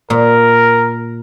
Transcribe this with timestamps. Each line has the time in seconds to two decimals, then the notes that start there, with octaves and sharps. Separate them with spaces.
0.10 A#2 A#4